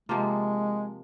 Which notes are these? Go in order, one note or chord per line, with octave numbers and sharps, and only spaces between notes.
C3 F3 G#3 A#3 F4